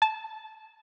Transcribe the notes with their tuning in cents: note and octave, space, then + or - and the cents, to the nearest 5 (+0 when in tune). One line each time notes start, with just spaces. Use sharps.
A5 -15